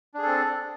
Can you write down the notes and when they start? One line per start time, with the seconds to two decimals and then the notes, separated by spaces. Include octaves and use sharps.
0.14 D4
0.18 G#4
0.23 A4
0.27 C4